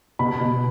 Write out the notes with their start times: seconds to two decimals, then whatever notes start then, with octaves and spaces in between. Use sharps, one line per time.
0.19 B2 B5
0.40 B2